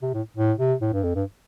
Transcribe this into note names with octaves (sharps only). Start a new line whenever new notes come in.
C3
A2
A2
C3
A2
G2
F2
G2